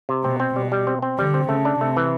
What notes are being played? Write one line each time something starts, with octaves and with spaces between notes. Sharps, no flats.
C3
B2 C4
C4
B2 G3
G3
C4
C4
D3 G3
C4
C#3 A3
D4
C3 A3
E3